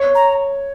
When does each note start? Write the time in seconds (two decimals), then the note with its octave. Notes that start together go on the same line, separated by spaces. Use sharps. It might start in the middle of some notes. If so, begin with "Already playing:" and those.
Already playing: C#5
0.15 A#5